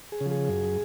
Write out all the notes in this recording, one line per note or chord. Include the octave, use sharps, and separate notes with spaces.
G#4
C#3
F3
G#4
F#2